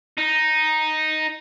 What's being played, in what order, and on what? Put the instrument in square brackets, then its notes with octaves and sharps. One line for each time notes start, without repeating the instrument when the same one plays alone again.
[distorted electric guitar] D#4